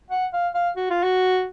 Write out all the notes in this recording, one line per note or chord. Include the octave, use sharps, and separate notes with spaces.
F#5
F5
F5
F#4
F4
F#4